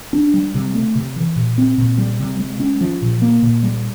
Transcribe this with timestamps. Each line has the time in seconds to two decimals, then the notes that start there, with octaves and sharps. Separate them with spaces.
0.13 D4
0.34 G3
0.55 C3
0.74 A3
0.95 C3
1.16 E3
1.36 A#2
1.58 C4
1.78 A#2
1.98 G3
2.20 C3
2.39 G#3
2.60 C#4
2.81 F3
3.02 A#2
3.22 A#3
3.43 A#2
3.63 G3